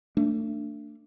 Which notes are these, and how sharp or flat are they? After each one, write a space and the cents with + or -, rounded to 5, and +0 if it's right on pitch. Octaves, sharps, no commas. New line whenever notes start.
A3 +30 D4 +0